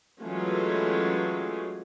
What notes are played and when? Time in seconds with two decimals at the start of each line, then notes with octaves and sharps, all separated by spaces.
0.21 E3 F#3 G#3 A3 C#4 F4